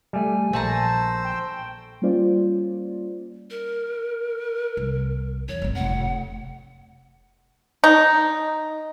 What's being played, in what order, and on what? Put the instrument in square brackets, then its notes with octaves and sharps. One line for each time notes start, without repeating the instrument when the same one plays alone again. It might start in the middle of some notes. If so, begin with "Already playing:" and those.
[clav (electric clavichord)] G3 A3 [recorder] G#5
[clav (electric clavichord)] A#1 [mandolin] A3 A5 A#5 [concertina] C5 E6
[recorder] G5
[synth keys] G3 A#3 C#4 F4 C5 D5
[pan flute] A#4
[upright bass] C2
[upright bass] E2 [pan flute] C#5
[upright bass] D#1 G#1
[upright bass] F1 C#3 [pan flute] F#5
[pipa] D#4